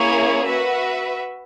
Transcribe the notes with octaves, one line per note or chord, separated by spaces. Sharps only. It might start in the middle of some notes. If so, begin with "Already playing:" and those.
Already playing: A#3 C#4 E4 G#4 C#5
F#4 B4 E5